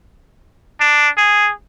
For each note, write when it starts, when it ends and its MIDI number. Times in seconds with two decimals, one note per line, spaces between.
0.80 1.08 62
1.17 1.51 68